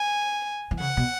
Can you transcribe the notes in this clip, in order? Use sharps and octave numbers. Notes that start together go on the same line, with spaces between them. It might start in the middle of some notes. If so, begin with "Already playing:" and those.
Already playing: G#5
E3
C#3 F#5
B2